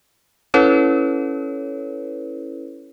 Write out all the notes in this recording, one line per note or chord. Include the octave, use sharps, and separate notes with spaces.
C#4 E4 A4 B4 C#5